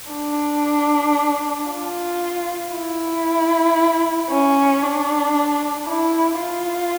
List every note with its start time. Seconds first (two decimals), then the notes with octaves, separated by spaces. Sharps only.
0.12 D4
1.69 F4
2.73 E4
4.30 C#4
4.83 D4
5.88 E4
6.40 F4